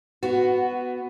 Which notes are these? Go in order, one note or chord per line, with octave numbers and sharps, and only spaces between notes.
B3 F#4